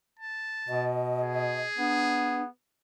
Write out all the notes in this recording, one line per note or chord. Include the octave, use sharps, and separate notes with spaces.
A5
B2 D#5
G#4
B3 D4